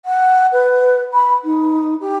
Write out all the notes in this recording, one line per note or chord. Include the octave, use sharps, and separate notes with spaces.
F#5
B4
B5
D#4
G4